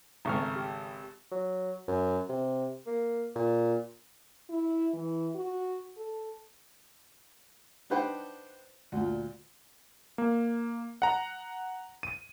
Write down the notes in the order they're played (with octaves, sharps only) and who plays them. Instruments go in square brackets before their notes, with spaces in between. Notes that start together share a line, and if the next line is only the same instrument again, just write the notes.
[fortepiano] G#1 C#3 A3 [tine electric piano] A#5 C#6 F6
[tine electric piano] G4
[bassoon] F#3
F#2
C3
A#3
A#2
[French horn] E4
E3
F#4
A4
[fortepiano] D4 D#4 B4 C5 F#5 G5
D2 A#2
[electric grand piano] A#3
F#5 A#5
D#7